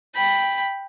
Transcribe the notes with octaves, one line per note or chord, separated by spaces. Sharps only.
G5 B5